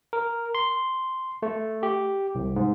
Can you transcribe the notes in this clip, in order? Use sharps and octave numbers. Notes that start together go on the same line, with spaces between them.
A#4
C6
A3
G4
C2
G#2